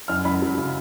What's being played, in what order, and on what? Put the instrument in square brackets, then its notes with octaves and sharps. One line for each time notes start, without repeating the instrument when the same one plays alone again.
[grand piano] F#2 F6
F#2 B5
F#3
C#3